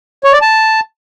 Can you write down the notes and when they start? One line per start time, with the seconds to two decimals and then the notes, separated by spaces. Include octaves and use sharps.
0.24 C#5
0.33 D5
0.42 A5